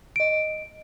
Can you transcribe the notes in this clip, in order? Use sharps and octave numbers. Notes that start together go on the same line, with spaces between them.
D#5 D7